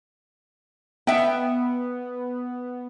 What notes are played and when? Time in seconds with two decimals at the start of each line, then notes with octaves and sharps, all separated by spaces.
1.07 B3 E5 G5